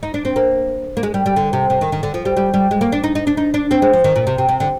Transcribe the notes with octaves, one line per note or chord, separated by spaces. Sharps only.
D#4
D4
C4
A#3
A#3
G#3
G3
G3
D3
C3
C3
D#3
D#3
D3
F3
G3
G3
G3
G#3
A#3
D4
D#4
D#4
D4
D#4
D4
C4
G#3
F3
D#3
A#2
C3
C3
C3
D3